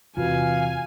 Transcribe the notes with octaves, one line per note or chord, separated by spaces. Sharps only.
E2 C3 F4 F#4 B4 F5 G#5